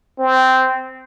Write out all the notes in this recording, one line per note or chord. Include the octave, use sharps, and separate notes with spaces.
C4